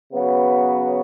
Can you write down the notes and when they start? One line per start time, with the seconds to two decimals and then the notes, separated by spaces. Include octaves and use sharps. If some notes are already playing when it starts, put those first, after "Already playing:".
0.13 C#3 F#3 B3 F#4